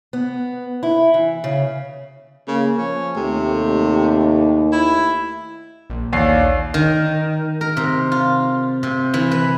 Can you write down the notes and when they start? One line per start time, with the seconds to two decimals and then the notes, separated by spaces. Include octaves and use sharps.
0.13 B3
0.83 E4
1.14 E3
1.44 C#3
2.48 C#3 A#3
2.77 F3 C#4
3.16 D#2 C3 A3
4.72 E4
5.90 A#1
6.13 D#2 C#5 D5 F5 C7
6.74 D#3
7.61 A#4
7.77 C3
8.12 F4
8.83 C3
9.14 E3
9.31 B4